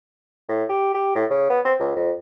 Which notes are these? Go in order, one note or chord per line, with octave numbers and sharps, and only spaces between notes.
A2
G4
G4
A2
C#3
B3
C4
C#2
F2